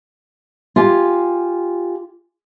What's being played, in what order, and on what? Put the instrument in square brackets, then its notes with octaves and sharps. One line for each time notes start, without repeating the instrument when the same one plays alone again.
[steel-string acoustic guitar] F4 G4 G#5